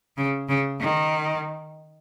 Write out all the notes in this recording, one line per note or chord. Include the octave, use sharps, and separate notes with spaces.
C#3
C#3
D#3